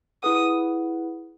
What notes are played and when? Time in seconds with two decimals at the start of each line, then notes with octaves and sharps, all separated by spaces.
0.23 E4 G#4 B4 F#5 D#6